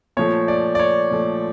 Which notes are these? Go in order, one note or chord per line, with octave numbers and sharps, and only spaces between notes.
A#2 F3 A3 C#5
D5
D5
C#5
A#2 F3 A3